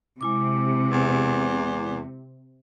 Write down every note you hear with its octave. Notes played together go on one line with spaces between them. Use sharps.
C3 G#3 E4 D6
E2